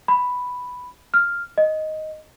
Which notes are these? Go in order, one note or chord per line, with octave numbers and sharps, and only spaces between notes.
B5
F6
D#5